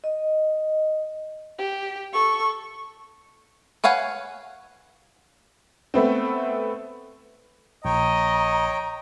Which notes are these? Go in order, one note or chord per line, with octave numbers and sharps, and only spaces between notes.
D#5
G4
A4 C#6
B4 C#5 F5 F#5 G#5
A3 B3 C4
A#1 C#5 D#5 G5 A#5